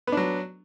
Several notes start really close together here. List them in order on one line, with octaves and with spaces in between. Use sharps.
B3 D4 F#3